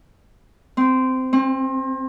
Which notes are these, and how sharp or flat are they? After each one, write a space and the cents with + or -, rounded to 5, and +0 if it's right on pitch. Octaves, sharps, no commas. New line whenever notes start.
C4 -15
C4 +30